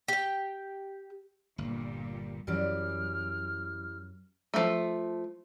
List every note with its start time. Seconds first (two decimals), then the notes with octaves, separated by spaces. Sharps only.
0.08 G4 G5
1.58 G1 A#2 G3
2.47 F#2 E3 G3 D5 F6
4.54 F3 A3